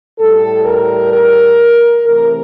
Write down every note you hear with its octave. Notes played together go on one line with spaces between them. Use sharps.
A2 G3 A4
A#4
A#4
C3 E3 A3 A#4